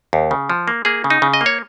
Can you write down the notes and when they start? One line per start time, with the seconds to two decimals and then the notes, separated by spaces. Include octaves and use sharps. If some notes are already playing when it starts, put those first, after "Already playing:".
0.13 D#2
0.31 C#3
0.50 F3
0.68 A#3
0.85 A#3 G#4
1.04 C#3
1.10 D#4
1.22 C#3
1.34 D#5
1.41 A#3
1.46 C#5